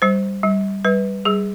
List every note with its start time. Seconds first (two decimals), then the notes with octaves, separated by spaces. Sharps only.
0.02 G3 C5
0.43 G3
0.85 G3 B4
1.25 G3 G#4